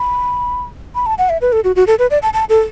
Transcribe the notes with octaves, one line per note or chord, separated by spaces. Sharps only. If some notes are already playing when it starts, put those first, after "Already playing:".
Already playing: B5
B5
A5
F#5
E5
B4
A4
F#4
F#4
A4
B4
D5
A5
A5
A4